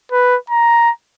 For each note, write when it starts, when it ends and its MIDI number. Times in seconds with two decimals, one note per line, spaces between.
0.12 0.37 71
0.50 0.91 82